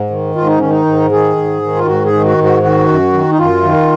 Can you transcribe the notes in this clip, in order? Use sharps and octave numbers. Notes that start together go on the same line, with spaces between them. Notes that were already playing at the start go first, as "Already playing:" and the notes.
Already playing: G#2
D#3
G#2 F4
D#4
D#3 C#4
D#4
G#2
D#3 G#4
G#2
D#3
F4
G#2 F#4
G#4
D#3
F#4
G#2
F#4
D#3 F#4
F#2
D#3
D#4
F#2 F4
D#3